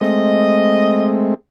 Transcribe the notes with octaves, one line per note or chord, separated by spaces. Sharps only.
G#3 A3 C4 D#5